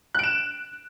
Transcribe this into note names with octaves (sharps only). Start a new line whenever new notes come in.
F#6 D7 E7